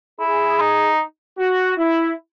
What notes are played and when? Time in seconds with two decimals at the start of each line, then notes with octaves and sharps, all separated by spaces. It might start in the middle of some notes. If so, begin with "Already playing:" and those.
0.20 E4 G#4
0.60 D#4
1.38 F#4
1.78 E4